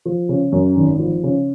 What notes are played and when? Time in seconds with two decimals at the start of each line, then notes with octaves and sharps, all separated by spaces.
0.05 F3
0.29 C#3
0.52 F#2
0.76 G#1
0.99 F3
1.23 C#3